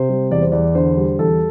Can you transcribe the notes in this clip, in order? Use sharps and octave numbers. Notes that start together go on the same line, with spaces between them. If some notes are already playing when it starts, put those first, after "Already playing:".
Already playing: C3 C5
G3
E2 D5
C5
E2 D5
D3 C5
G3
E2 A4